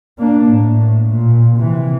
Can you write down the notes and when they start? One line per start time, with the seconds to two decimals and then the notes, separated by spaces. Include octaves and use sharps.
0.19 A#3 D4
0.49 A2
1.13 A#2
1.57 C3 E3